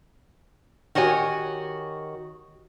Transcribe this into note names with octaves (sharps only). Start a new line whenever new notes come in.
D#3 F#4 G4 C#5 G#5